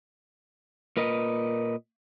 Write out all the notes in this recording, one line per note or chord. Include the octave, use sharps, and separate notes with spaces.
A#2 A#4 B4 D#5